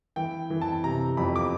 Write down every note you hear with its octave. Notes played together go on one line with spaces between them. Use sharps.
E3 G5
E3
A5
C3 A#5
F2 B5
D6